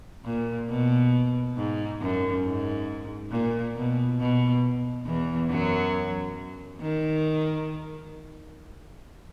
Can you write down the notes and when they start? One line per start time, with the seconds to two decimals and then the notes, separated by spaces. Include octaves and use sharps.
0.25 A#2
0.69 B2
1.56 G#2
2.01 F#2
2.44 G#2
3.31 A#2
3.76 B2
4.19 B2
5.06 E2 E3
5.50 F#2 F#3
6.81 D#3